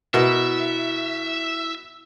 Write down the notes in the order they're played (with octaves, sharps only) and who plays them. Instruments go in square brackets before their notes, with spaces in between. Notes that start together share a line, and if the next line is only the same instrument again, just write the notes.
[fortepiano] B2 [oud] E4 A#4 D#5 [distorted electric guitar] E5